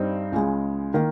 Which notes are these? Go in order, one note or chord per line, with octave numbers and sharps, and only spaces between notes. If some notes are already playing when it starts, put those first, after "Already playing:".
Already playing: G2 G3 C4 D#4
C#2 C#3 G#3
D#3 A#3